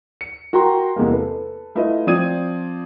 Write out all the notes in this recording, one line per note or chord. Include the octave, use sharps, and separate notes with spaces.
C#7
F#4 A#4 G5 A#5 C6
E2 C3 G#3 A#3
A4 B4
A3 E4 F4 B4 D#5
F3 C4 D5 D#6 G#6 D#7